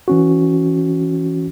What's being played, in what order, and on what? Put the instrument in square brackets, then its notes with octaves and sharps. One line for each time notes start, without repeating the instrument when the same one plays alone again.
[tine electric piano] E3 C#4 F#4